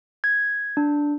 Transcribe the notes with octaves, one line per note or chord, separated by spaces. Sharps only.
G#6
D4